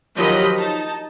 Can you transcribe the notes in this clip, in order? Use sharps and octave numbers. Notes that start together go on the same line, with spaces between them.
D#3 F3 F#3 G4 D#5 B5
D#4 A5